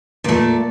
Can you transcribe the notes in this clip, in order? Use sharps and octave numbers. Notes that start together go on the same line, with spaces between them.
A#2 A3 D5